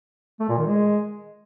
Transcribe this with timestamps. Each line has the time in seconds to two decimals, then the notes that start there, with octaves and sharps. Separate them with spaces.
0.40 A3
0.49 A#2
0.58 D#3
0.67 G#3